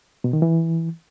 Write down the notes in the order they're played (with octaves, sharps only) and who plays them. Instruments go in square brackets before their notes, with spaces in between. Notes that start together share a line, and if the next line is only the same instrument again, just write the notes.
[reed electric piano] B2
D#3
E3